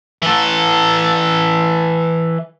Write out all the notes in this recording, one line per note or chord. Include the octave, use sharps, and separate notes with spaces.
E3 A4